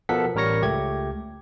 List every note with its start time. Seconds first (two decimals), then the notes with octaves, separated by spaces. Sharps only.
0.09 B2 F3 A4 A#4 F#5 B6
0.35 A1 G3 A#4 C#5 A#6 C#7
0.62 C#2 A3 G4 G#6